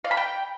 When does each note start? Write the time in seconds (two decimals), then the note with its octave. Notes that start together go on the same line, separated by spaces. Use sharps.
0.04 F5
0.11 B5
0.17 G5